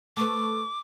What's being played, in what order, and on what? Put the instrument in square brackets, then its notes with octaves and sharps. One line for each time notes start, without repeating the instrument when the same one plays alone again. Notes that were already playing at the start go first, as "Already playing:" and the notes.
[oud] A3 B4 [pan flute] D6